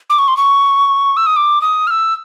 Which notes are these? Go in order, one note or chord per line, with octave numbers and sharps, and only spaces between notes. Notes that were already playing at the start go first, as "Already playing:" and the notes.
D6
C#6
C6
C#6
E6
D#6
D6
D#6
F6
E6